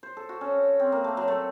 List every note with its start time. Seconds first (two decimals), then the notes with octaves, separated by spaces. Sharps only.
0.03 C5
0.17 A4
0.29 F#4
0.41 C#4
0.80 C4
0.92 A#3
1.04 A3
1.17 F#3
1.28 A3